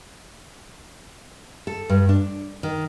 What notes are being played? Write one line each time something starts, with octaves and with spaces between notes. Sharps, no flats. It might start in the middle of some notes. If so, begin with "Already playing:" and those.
A4
G2
D4
D#3